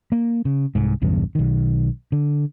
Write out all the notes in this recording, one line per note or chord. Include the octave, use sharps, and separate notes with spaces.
A#3
C#3
C2 G#2
B1 E2 G2 C#3
B1 D#3
D3